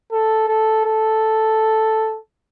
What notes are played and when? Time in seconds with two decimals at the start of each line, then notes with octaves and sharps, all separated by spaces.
0.12 A4
0.48 A4
0.85 A4